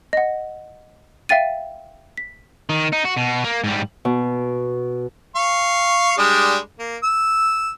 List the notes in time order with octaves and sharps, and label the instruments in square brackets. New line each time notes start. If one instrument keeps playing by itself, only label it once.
[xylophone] D#5 F#5
E5 F5 G5 A6 D#7
B6
[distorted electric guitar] D#3
D#4
F#4
B2
A#3
G#2 G3
[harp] B2
[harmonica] F5 C#6
G3 G#3 D4
A#3
E6